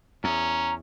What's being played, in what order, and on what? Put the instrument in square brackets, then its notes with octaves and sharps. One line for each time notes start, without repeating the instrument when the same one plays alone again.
[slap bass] E2 [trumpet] C#4 [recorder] A#5